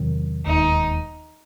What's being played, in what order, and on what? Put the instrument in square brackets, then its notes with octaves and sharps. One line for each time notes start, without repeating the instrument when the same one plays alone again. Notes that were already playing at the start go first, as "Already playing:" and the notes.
Already playing: [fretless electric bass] E2 C3 D#3 F#3
[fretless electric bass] E1 D#2 D#3 [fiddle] D#4